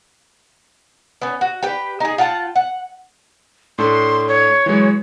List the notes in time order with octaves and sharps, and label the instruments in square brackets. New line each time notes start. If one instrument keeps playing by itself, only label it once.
[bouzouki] B3 C#4
F#4
G4 B4 G5
D#4 G#4
F4 F#5 G5 A5
F#5
[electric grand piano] A2 D4 A4 [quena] C6
[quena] C#5
[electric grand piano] E3 F#3 G#3